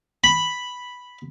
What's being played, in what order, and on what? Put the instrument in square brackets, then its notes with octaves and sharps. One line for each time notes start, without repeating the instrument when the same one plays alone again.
[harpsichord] B5